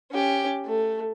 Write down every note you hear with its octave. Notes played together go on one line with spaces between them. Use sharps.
C#4 G4
A3